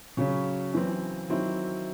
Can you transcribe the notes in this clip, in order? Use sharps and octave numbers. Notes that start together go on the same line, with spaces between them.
C#3 F#3 C#4
F#2 E3 C4
D#3 F#3 C4 E4